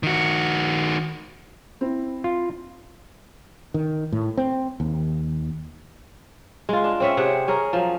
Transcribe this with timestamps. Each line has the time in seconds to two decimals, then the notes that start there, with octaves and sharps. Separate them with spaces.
0.03 D#3 F#4
1.81 C4 E4
2.24 F4
3.74 D#3
4.12 A2
4.37 C4
4.80 D#2
6.69 G#3 F4
6.84 D4
7.00 C4 C#4 E5
7.17 C3 G#4 F#5
7.48 C#4 G#4 A#4
7.73 F3 F#3